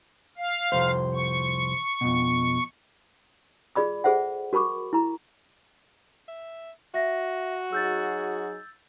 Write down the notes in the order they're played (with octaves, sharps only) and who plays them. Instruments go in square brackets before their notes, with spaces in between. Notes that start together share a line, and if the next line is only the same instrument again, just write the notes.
[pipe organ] F5
[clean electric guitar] C2 F2 C5
[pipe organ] C#6
[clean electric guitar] F2 B2
[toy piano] F4 G#4 D5 B5 D#6
G#4 A4 C5 E5 F#5
F#4 A#4 B5 C#6 D6
E4 A#5
[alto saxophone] E5
[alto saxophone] F#4 [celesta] E5 A#6
[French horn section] F#3 D#4 G#4 [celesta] E6 G6 A6